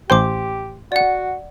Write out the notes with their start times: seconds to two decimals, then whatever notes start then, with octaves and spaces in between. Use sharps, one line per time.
0.10 A1 G4 C5 G5 C6 D6
0.92 F#4 D5 F#5